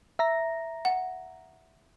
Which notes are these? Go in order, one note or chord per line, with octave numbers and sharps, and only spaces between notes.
E5 A#5 A#6
F#5